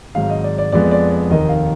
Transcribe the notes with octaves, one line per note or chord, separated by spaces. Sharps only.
G#1 G#2 F#3 F5
D#5
D5
D5
F2 F3 G#3 B3 D5
D5
D5
F1 D#2 D#3 A#3 D#5
F5